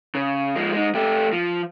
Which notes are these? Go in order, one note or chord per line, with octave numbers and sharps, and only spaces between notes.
C#3
F3 G#3
G#3 D#4
A3 G4
F3